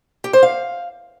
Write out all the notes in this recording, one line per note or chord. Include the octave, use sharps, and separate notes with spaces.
G4
C5
F5